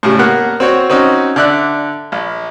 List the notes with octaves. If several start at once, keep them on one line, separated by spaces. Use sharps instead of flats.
A2 C#3 G3
A#3 B3 A#4 F#5 F#6
C4 F#4 C#5
C4 C#4 D#4 F#4
D3 D5 E5 F#6
A#1